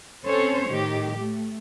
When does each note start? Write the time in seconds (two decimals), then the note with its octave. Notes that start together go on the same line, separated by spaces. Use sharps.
0.24 C4 C#4 A4 C5 C#5
0.69 A2 D#3 G4
1.18 A3